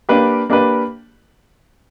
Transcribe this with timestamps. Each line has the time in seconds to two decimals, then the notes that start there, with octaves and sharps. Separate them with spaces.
0.09 A#3 D4 G4 B4
0.50 A#3 D4 G4 B4